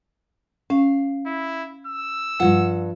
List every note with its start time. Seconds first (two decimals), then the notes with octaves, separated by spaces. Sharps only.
0.70 C#4 F5
1.26 E4
1.87 E6
2.40 G2 C#3 F3 F4 F#5